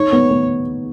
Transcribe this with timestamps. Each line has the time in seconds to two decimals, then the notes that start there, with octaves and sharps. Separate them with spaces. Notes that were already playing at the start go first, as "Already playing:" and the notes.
Already playing: D#4 C#5
0.13 B3
0.31 B3